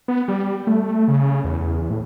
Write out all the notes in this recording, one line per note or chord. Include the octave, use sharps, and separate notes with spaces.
B3
G3
A3
A3
C#3
E2
A2